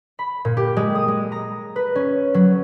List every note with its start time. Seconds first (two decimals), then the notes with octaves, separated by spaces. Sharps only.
0.19 B5
0.45 A#2
0.57 G4
0.77 G#3
0.95 D#6
1.08 G#3
1.32 A#5
1.76 B4
1.95 C#4
2.34 F#3